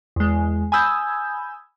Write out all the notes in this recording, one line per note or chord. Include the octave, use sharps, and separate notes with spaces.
E2 G#3
G#5 B5 D#6 E6 G6 G#6